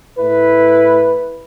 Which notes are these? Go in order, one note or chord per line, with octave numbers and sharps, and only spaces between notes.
A2 E4 B4